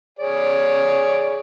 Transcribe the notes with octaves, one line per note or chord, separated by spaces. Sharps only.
G#4 C#5 D5